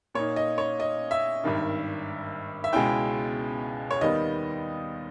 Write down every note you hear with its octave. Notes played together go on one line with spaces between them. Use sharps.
A#2 A#3 D#4 C#5
D#5
C#5
D#5
E5
G#1 G2 D#3
E5
C#2 B2 G#3 C#4 E4 G5
C#5
D#2 D#3 G3 B3 D#5